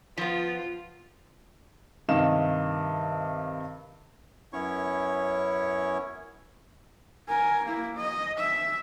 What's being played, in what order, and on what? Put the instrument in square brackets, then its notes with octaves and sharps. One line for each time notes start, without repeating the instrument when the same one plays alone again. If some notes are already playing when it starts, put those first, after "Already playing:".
[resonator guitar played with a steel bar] F3 B3 [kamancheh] F4
[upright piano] G2 C3 D#3 D#5 F5 E7
[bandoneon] F#2 B3 C#4 E4 C#5 C#6
[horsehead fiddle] A#4 G#5
A#3 E4
D#5
E5